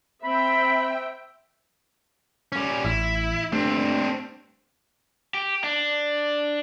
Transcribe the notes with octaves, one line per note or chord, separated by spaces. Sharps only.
C4 E5 G5 B5
G3 C#4
A1 E4
G2 A3 C4 D4
G4
D4